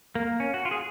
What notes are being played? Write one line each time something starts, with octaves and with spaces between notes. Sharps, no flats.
A#3
C#4
F#4
F4
G#4